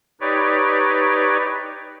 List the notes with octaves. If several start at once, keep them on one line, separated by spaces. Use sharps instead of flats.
D#4 G4 B4 C#5 D5